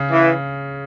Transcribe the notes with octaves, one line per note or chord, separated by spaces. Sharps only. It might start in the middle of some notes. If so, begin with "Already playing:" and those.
Already playing: C#3
E3